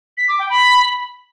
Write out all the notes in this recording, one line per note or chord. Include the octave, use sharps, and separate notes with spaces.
B6
D6
G5
B5